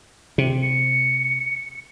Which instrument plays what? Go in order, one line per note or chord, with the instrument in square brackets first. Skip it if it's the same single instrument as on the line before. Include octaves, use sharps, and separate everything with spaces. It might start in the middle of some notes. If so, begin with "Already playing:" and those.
[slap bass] C3
[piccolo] C#7